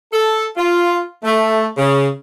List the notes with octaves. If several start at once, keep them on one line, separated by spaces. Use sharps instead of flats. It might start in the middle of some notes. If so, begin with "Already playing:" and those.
A4
F4
A3
C#3